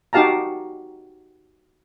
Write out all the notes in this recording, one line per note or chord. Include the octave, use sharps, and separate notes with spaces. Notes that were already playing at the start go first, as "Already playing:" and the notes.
D#4 F#4 G4 F5 A5 A#5